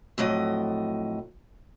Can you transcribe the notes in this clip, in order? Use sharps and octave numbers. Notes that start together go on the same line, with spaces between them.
F2 A2 F#3 D#5